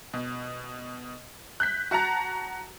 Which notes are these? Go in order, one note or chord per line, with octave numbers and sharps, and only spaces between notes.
B2
F#6 G6 B6
F#4 F#5 A5 A#5